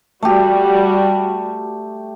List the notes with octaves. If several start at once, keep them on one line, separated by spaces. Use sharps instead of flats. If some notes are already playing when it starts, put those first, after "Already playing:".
G3 A3 F#4 G4